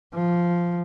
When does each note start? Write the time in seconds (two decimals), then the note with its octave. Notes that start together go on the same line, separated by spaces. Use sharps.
0.14 F3